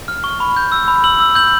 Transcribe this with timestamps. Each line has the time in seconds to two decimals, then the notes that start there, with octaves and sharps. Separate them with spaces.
0.08 F6
0.24 C#6
0.40 B5
0.57 G6
0.72 E6
0.88 B5
1.04 E6 F#7
1.20 E6
1.35 G6 F#7